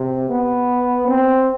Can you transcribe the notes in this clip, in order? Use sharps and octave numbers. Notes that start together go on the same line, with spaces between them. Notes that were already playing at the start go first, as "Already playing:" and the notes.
Already playing: C3
B3
C4